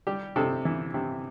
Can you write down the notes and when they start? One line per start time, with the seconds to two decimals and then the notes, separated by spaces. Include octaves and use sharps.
0.07 G3 G4
0.36 C3 A4
0.65 E3
0.94 C3